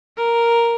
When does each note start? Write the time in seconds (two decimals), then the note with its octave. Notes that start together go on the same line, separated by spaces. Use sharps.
0.17 A#4